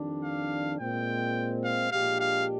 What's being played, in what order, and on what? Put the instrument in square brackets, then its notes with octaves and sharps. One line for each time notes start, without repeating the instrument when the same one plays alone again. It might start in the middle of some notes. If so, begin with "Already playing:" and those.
Already playing: [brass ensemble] F2 D#3 G3 D4
[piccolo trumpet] F5
[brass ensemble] A#2 G#3 C4 [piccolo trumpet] G5
[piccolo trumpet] F5
[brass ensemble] A#1 A#2 G#3 D4 G4 [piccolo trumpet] F5
[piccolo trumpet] F5